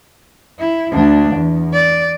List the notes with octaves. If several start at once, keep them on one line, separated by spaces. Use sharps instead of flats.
E4
D2 D4
E2
D5